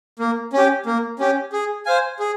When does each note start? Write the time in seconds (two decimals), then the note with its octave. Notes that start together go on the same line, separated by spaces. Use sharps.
0.19 A#3
0.53 C#4 G4
0.86 A#3
1.19 C#4 G4
1.53 G#4
1.86 C5 F5 G#5
2.20 G#4